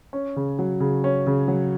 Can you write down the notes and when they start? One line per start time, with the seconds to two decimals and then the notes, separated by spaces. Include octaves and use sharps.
0.13 C#4
0.36 C#3
0.59 F#3
0.80 C#3
1.04 C#4
1.27 C#3
1.48 F#3